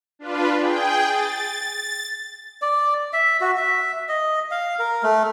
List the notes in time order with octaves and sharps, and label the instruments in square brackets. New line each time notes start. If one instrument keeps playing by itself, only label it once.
[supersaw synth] D4 F4 B4
G#4 G5
A6
[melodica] D5
E5
F#4
E5
D#5
F5
A#4
A3